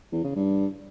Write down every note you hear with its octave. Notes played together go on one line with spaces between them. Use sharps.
E2
C#3
G2